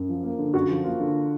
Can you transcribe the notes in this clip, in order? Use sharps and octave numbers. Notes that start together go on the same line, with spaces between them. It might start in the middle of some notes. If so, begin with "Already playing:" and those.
Already playing: F#2
F3
A#3
D3
F#2 F#4
F3
A#3 F4
D3